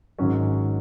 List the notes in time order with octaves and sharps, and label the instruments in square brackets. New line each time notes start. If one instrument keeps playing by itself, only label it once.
[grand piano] G#1 G#2 F#3 C#4